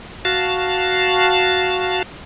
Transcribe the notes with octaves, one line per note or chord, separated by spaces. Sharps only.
F#4 F5 A5